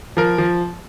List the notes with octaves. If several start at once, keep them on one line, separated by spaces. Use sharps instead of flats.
F3 A#4
F3